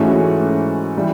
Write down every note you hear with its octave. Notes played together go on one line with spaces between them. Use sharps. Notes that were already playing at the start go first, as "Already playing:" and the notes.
Already playing: G#2 E3 A3 C#4 F#4
E3 G3